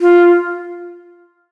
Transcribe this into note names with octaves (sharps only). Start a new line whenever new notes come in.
F4